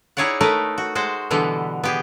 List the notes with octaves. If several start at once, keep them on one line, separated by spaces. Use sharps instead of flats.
D#4 E4 G#4 C#5 D5 F#5
A3 D#4 A#4 B4
F#4
G#3 F#4 C5
B2 D3 E3 G3 B3
B3 G4 G#4